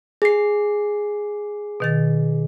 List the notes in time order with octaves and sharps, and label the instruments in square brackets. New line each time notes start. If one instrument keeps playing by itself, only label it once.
[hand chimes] G#4 C7
[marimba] B2 D#3 A6